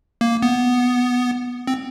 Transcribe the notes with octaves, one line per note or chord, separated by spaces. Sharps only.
A#3
B3
C4